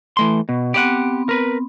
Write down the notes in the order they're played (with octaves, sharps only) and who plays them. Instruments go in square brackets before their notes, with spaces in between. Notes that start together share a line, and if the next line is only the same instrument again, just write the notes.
[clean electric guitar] E3 A3 C6
B2
[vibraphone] B3 C4 [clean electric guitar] G4 D5 F#5
[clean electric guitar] A#4 B4